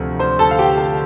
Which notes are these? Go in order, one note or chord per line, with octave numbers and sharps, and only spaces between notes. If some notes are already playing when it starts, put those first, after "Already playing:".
Already playing: D2 C3 F3
C5 C6
A4 A5
F5
G4 G5
A4 A5